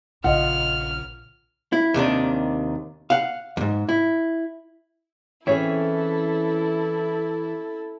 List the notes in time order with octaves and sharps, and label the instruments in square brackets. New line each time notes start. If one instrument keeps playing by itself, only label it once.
[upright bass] A#1 C#3 [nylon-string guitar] F4 D#5 [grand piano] F#5 [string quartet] F6
[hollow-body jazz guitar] E4
D#2 C3 D#3 D4
F5 F#5
E2 G#2
E4
[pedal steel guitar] E3 E5 [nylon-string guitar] C4 C#4 G#4 [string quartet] E4 A4 [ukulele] C#5